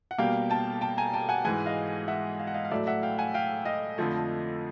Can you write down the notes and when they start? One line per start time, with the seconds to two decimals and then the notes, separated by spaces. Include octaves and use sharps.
0.11 F#5
0.18 B2 G3 A#3 F5 G5
0.50 G5 A5
0.81 G5 A5
0.98 G#5 A#5
1.13 G5 A5
1.29 F#5 G#5
1.44 G#2 E3 G#3 F#5 G#5
1.66 D#5 F5
2.08 E5 F#5
2.40 F5
2.47 F#5
2.54 D#5 F5
2.65 F5
2.71 A2 F#3 A3 D5 E5
2.87 E5 F#5
3.03 F5 G5
3.18 F#5 G#5
3.34 F5 G5
3.65 D#5 F5
3.98 F2 D3 F3 A3